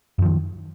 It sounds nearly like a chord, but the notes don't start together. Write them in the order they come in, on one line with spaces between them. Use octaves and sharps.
F#2 F3 D#3